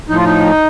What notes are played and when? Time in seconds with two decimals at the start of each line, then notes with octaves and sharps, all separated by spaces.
0.09 A2 F3 D#4
0.17 F4
0.25 D#4